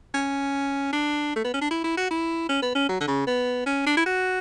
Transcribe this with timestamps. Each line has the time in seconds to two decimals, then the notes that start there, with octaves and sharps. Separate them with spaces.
0.14 C#4
0.93 D4
1.36 A3
1.44 B3
1.54 C#4
1.62 D4
1.71 E4
1.84 E4
1.97 F#4
2.11 E4
2.49 C#4
2.62 B3
2.75 C#4
2.89 F#3
3.01 D3
3.08 C#3
3.27 B3
3.67 C#4
3.87 D4
3.97 E4
4.06 F#4